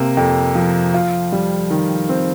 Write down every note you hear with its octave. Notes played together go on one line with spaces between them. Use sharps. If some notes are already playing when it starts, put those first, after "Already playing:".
Already playing: C3 A#3
F2
F3
F4
G3
D#3
C4